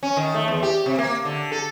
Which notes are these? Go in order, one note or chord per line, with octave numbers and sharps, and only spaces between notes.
C#4
D#3
A3
E2
G4
C3
A#3
D3
A4